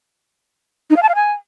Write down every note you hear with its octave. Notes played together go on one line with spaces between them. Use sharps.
D#4
F5
A5
F5
G#5